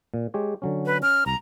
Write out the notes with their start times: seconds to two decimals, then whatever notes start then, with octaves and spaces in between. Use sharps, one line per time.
0.14 A#2
0.34 G#3 G4 C#5
0.62 D3 F#3 C#4
0.86 B4
1.02 C#4 F6
1.26 C2 A#5